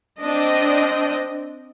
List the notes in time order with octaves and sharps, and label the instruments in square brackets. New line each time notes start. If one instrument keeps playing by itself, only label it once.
[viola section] C4 D4 D#5